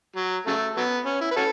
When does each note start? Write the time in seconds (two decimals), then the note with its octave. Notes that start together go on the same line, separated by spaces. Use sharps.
0.16 F#3
0.47 C#3 F#3 A3
0.77 F#3 B3
1.06 C#4
1.21 E4
1.31 B4
1.36 C#4 F#4 A4